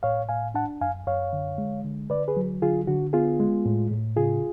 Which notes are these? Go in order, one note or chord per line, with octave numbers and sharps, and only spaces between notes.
A2 C#5 F5
A2 F5 G#5
D4 F#5 A5
F#2 F5 G#5
F#2 C#5 F5
D3
G#3
D3
D3 B4 D5
G#4 B4
F#3
D3 F4 G#4
D3 F#4
B3 F4 G#4
G#3
A2
A2
C#3 F4 G#4